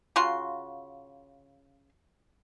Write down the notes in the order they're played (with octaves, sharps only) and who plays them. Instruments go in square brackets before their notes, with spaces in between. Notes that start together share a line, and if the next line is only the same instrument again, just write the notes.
[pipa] C#3 F4 F#4 C6